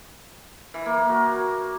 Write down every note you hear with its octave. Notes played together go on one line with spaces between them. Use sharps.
E3
A#3
A#3
F#4